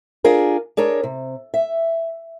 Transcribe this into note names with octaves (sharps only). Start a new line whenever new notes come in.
D4 F4 G#4 A#4
D4 G#4 A#4 C#5
C3
E5